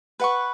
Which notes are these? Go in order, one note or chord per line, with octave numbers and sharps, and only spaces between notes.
B4 F#5 C#6